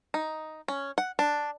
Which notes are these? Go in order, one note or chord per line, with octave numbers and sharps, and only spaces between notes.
D#4
C#4
F#5
D4